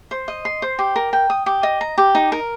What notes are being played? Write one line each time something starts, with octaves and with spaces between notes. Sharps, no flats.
C5
D#5
C6
C5
G4
A#4
G5
D#6
G4
D#5
A#5
G4
D#4
A#4